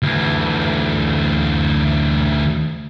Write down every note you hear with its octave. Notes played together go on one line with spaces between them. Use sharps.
D2 E3